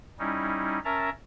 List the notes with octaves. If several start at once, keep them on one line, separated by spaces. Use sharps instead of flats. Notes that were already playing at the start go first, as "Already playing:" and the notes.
G3 C#4 D#4 E4
C#4 A#4 E5 A5 A#5